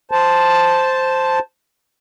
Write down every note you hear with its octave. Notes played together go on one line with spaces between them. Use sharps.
C5 A5